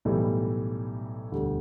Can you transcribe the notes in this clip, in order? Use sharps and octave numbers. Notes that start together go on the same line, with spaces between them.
B1 A2 E3 G3
E1 D2 D3 G3